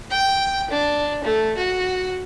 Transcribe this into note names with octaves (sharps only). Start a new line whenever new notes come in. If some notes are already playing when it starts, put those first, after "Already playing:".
G5
D4
A3
F#4